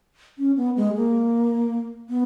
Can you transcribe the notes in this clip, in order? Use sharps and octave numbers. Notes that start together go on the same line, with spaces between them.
C#4
B3
G#3
A#3
B3